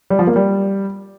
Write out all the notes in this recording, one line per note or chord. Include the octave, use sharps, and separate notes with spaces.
G3
F3
A#3
G3